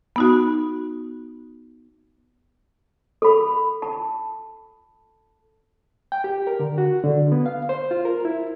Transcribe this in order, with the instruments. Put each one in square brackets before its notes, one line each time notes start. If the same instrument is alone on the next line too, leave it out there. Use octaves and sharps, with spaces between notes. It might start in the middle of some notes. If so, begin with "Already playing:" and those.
[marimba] B3 D#4 F#4
[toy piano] A4 B5
A5
[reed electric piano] G5
G4
A#4
D3
F#4
D3
B3
F5
C5
F4
A#4
E4